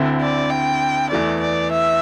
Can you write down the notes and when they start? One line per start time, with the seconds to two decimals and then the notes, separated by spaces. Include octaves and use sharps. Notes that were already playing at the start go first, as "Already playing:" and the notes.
Already playing: D2 D3 C4 E4
0.21 D5
0.50 G5
1.11 E2 E3 A3 D5
1.41 D5
1.72 E5